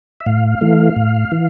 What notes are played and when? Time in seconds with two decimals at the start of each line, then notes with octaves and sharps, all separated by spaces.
0.20 E5
0.26 A2 F5
0.61 E3 A3
0.96 A2
1.32 E3